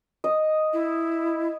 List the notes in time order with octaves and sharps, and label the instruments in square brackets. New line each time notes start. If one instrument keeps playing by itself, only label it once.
[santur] D#5
[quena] E4